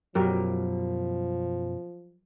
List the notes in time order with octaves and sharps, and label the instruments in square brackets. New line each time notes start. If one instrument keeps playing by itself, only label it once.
[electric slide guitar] F#2 B2 [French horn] F3 [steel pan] F#3 G4 A#4